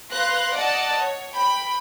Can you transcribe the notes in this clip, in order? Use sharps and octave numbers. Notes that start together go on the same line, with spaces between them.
B4 F5 C6 F#6 A#6
D5 D#5 F#5 A5
C#5
G5 B5